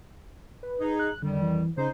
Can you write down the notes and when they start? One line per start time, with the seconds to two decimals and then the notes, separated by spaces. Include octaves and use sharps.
0.63 B4
0.80 D#4 G#4
0.99 F#6
1.22 F2 D3 D#3 G3
1.42 E3
1.77 C#3 D#4 C5